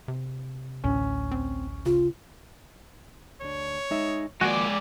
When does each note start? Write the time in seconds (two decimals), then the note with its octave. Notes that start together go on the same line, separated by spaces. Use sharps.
0.08 C3
0.84 A1 D2 A2 C#4
1.31 C4
1.86 C#3 F4
3.41 D2 D4 C#5
3.91 G#3 D#4 E5
4.41 D#3 F3 G#3 A#3 F#4 D5 G#5